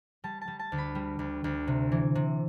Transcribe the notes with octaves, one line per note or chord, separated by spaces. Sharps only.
G3 A5
A5
G3
A5
D2
B5
G3
D2
D2
C3
E3
C3